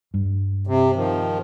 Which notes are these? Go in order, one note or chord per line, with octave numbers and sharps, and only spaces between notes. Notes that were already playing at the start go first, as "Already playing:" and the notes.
G2
C3
D#3 F3